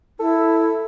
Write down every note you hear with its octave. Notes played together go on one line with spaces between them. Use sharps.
E4 A4